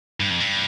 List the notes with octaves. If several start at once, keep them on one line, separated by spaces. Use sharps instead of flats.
G2
F2
G2